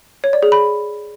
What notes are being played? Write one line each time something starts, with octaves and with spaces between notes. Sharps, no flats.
C#5
D5
G#4
B5